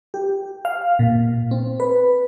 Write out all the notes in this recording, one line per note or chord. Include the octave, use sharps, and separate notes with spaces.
G4
F5
A#2
C4
B4